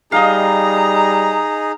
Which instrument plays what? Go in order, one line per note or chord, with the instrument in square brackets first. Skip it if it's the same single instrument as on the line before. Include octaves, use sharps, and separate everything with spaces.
[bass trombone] G3 [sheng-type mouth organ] D#4 G#4 [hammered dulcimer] D#5 F5 [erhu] A#5